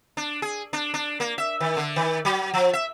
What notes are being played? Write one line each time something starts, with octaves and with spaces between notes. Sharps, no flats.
D4
G#4
D4
D4
A#3
E5
D#3
D3
D#3
F#3
F3
E5